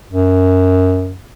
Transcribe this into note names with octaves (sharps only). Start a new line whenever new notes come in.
F#2